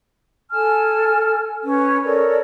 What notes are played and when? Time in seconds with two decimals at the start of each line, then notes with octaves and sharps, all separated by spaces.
0.51 A4 G#5 A5 F6
1.64 C#4 B4
2.04 A4 A#4 C#5 D5